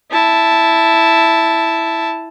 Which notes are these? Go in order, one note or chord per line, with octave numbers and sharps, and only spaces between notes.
E4 A5